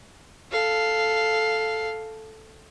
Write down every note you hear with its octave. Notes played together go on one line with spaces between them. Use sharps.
A4 F5